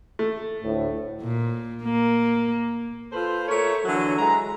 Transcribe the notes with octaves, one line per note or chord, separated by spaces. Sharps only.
A3
D2 A2
A#2
A#3
F4 A4 B4 C5
A3 A#4 C#5
D3 E3 F#3
E3 G#3 A#5